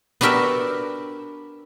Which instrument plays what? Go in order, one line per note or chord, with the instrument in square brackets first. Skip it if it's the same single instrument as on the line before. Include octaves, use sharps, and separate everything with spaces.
[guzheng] B3 D4 F#4 G4 A#4 E5